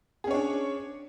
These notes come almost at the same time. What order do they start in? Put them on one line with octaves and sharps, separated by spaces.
G#4 C#4 C#5 D4